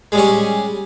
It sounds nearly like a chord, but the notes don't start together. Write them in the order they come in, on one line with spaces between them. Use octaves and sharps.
G#3 G3 C#4